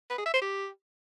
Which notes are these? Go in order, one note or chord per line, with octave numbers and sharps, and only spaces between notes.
B4
G#4
E5
C5
G4